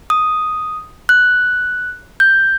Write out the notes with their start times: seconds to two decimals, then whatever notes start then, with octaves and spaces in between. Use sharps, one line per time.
0.10 D#6
1.09 F#6
2.20 G6